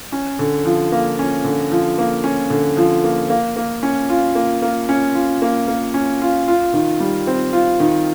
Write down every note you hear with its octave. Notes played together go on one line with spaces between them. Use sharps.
C#4
D3
F3
A#3
C#4
D3
F3
A#3
C#4
D3
F3
A#3
A#3
A#3
C#4
F4
A#3
A#3
C#4
F4
A#3
A#3
C#4
F4
F4
D#3
G3
C4
F4
D#3